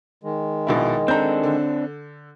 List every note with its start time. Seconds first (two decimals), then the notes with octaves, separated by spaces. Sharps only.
0.24 D#3 G#3
0.67 A#1 B2 E4
1.08 C4 D4 A4 A#5 G6
1.43 D3